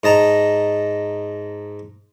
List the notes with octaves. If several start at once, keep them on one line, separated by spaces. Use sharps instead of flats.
G#2 D#5 A5 A#5